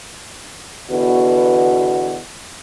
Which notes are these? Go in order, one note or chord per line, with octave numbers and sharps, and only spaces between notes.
E2 B2 D3 F#4 B4